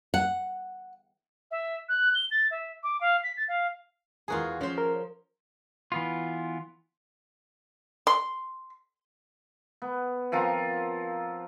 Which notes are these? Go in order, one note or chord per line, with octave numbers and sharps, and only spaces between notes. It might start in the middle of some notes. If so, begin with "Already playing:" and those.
F#5
E5
F#6
G7
A6
E5
D6
F5
B6
A6
F5
E2 F4 F#4 G#4 A#4 G#5
F3 C#4 C5
A#4
E3 B3 F4
C6
B3
F3 C4 F4 A#4